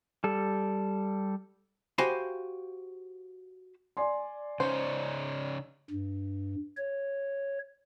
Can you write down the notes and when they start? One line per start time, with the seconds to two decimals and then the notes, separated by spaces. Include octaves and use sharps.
0.24 G3 A4
1.98 F#4 G4 C5 F5 G#5 B5
3.97 D5 G#5 C6
4.60 C#3 C#4 D#4 C5
5.90 G2
6.77 C#5